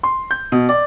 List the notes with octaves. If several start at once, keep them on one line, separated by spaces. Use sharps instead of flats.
C6
G6
B2
D5